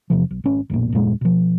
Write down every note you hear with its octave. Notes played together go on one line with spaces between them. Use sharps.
E2 C3 F3
B1
G#1 C#4
F1 B1 A#2
D#1 F#2 A#2 G#3
B2 F3